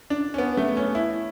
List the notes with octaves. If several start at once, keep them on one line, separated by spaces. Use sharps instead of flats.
D4
C#4
B3
A3
C#4
E4